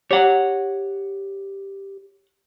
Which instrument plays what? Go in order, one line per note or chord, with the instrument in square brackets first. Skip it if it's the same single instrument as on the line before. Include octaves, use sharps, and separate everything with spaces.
[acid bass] G4 [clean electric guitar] C#5 F#5